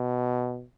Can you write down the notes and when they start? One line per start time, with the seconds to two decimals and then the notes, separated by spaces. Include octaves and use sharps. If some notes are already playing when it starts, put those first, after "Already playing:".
Already playing: B2